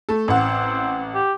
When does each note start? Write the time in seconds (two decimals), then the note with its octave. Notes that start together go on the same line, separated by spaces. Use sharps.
0.09 A3 A4
0.28 A1 C4 F#5
1.14 G4